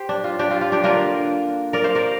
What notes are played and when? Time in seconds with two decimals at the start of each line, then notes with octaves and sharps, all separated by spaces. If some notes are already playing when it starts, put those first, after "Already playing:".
Already playing: G4 C5
0.09 D4
0.24 F4
0.39 D4 G4
0.51 F4
0.61 F4
0.72 D4 G4
0.83 D3 A#3 D4 F4 A#4
1.73 A#4 D5
1.84 C5 F5
1.95 A#4 D5